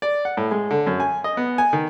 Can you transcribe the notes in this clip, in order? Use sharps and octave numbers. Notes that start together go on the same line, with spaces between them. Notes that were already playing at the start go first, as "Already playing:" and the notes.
D5
F#5
A2
G#3
D3
F#2
G#5
D#5
B3
G#5
D#3